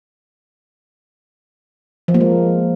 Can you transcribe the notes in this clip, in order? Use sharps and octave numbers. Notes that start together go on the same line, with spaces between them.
F3
A#3
G#3